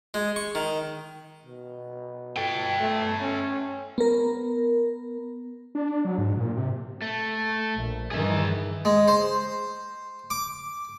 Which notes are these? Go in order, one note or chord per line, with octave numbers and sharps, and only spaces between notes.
G#3
C#6
D#3
B2
A4 G5
A3
C#4
B3 A#4
D4
F#3
G#2
A#2
C3
A3
A#1
G2 D#3 E3 G#4 E5
G#3
C5
D6